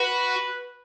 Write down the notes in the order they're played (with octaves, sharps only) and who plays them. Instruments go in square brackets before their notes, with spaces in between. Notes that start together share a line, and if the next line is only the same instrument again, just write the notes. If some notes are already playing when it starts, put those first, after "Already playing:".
Already playing: [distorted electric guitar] F#4 [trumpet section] B4